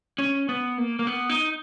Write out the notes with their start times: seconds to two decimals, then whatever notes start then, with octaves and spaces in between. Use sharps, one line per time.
0.18 C#4
0.49 B3
0.78 A#3
0.99 A#3
1.07 B3
1.29 D#4